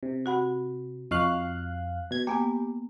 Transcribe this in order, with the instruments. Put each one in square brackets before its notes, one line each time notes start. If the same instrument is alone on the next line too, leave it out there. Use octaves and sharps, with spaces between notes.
[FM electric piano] C3
[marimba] F#4 F#5 B5
[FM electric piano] F2 F5 F#6 [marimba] D#5 C#6
[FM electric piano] B2 G#6
[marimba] A#3 B3 G#5 [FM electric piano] G4